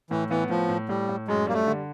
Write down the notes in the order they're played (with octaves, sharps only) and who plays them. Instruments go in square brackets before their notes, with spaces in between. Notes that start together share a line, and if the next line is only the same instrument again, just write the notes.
[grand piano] A2 [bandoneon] E3
[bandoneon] E3 [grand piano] B3
[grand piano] A2 [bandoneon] F3
[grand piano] A2
[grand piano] A2 [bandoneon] G3
[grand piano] A2
[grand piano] F#2 [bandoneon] G#3
[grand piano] G3 [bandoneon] A#3
[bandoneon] A3
[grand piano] D3